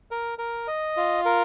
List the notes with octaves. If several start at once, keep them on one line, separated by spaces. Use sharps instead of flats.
A#4
A#4
D#5
F4
A#4